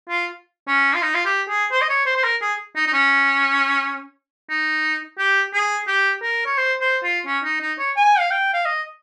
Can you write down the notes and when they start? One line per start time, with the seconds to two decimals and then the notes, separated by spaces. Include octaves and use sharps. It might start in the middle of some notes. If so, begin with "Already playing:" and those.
0.10 F4
0.68 C#4
0.95 F4
1.02 D#4
1.14 F4
1.26 G4
1.49 G#4
1.71 C5
1.81 D#5
1.89 C#5
2.06 C5
2.16 C5
2.24 A#4
2.42 G#4
2.76 D#4
2.87 D#4
2.93 C#4
4.49 D#4
5.18 G4
5.53 G#4
5.87 G4
6.22 A#4
6.46 C#5
6.58 C5
6.81 C5
7.03 F4
7.26 C#4
7.44 D#4
7.61 D#4
7.79 C#5
7.96 G#5
8.19 F5
8.31 G5
8.53 F5
8.65 D#5